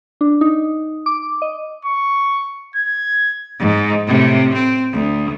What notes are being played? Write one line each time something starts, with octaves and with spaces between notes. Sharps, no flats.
D4
D#4
D6
D#5
C#6
G#6
G#2
A2 C3
C4
D2